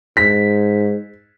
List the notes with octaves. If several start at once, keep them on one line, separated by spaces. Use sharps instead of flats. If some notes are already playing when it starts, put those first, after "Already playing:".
G#2 B6